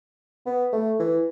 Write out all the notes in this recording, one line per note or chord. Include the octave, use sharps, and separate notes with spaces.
B3
A3
E3